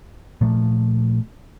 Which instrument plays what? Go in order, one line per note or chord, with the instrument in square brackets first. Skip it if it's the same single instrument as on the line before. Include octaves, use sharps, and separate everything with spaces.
[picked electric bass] A#2 F3 A3